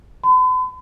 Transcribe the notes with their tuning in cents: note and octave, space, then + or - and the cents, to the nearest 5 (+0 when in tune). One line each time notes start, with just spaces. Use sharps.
B5 +45